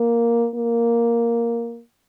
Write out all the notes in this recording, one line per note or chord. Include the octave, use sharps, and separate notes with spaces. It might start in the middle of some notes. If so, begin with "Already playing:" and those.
Already playing: A#3
A#3